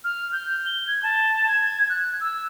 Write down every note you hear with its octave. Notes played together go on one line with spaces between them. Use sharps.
F6
G6
G7
G#6
A5
G#6
F#6
E6